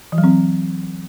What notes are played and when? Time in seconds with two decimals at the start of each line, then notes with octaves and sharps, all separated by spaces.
0.12 E3
0.18 F#3
0.24 C4